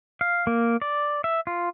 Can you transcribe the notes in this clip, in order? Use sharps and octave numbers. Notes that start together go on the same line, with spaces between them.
F5
A#3
D5
E5
F4